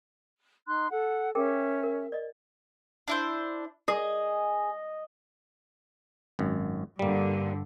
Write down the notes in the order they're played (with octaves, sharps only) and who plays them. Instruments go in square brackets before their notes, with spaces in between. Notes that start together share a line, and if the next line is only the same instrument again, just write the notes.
[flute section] D#4 C6 F#6
A4 F#5
[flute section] C#4 E5 [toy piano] G#4 A#4 G5
[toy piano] A#4
D5 D#5
[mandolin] D4 E4 C5
[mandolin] G#4 [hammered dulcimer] D#5
[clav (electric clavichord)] G#1 F#2
[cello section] G2 D3 [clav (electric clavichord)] G3 A#3